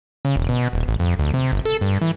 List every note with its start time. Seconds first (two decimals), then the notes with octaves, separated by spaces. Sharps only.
0.25 C#3
0.36 E1
0.49 B2
0.73 D#1
0.88 A1
0.99 F2
1.19 D2
1.34 C3
1.52 G1
1.65 A4
1.81 G2
2.01 E3